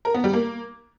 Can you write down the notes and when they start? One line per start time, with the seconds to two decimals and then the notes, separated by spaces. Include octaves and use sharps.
0.05 A#4
0.14 B3
0.24 G3
0.33 A#3